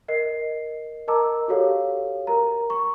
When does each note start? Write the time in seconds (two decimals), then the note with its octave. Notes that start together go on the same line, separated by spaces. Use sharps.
0.08 A#4 D#5 C7
1.08 A#4 D#5 A5 A#5 D6 E6
1.48 F#4 G4 A4 C#5 F5
2.27 A#4 A#5
2.70 C#6